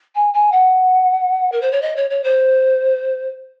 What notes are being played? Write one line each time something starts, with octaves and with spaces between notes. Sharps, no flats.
G#5
G#5
F#5
A#4
C5
C#5
D#5
C#5
C#5
C5